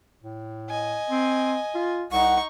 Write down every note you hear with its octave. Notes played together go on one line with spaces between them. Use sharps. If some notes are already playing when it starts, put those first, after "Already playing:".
A2
D#5 G#5
C4
F4
C2 D#4 F#5 C#6